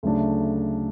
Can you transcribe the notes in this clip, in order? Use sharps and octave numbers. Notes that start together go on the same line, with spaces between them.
D2 C#3 F#3 A3 D4